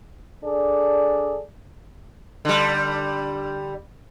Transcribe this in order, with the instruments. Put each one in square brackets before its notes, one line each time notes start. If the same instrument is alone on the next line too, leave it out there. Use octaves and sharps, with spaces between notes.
[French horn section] D4 G#4 A4 D5
[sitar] D3 G3